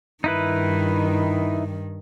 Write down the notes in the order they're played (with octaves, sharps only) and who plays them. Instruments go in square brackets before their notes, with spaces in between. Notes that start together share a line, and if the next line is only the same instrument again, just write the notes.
[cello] G2 D#3 [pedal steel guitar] D#4 E4 B4